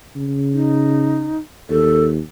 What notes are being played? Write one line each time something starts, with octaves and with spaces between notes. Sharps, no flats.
C#3
D#4
D#2 A4